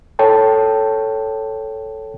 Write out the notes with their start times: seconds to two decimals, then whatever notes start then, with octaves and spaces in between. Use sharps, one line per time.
0.19 A4 C#5 G5 A5